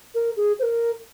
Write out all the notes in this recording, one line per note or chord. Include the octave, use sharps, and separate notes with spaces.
A#4
G#4
C5
A#4